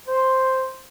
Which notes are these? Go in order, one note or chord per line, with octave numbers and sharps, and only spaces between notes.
C5